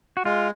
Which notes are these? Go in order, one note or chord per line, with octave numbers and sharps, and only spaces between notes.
F#4
G#3 F4